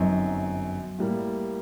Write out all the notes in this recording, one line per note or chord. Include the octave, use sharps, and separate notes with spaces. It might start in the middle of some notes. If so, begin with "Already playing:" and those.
Already playing: G1 F#2 F#3 C4 D#4
A2 G3 A#3